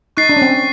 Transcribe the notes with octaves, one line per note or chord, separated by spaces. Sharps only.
D#4 C#6 F#6 A6 C7 D#7
D4
C#4
C4